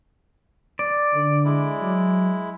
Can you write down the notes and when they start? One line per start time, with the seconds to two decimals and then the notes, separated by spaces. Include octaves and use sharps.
0.79 D5
1.14 D3
1.45 G#3 E4
1.81 F#3